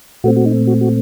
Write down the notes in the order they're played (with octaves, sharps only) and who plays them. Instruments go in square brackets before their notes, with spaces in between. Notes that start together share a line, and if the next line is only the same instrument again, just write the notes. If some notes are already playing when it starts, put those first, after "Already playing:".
[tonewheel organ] A#2 A3 C4 F#4
F#4
D#4
F#4
F#4